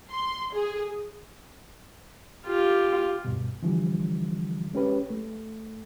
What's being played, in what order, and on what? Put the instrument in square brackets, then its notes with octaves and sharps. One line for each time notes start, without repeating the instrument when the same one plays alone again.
[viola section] C6
G#4
[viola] F4 G4
[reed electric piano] D2 G2 B2
D3 E3 F3 G3
G#3 C#4 G4 B4
A3